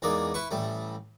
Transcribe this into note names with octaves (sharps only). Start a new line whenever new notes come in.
E2 G#3 A#3 D#4 D5
E4 B4 C#6
A1 G3 A3